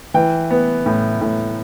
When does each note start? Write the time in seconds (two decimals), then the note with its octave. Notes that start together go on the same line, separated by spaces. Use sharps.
0.14 E3 G5
0.50 B3
0.86 A2
1.21 A2